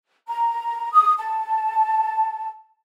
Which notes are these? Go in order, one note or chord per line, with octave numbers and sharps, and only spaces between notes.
A#5
D#6
A5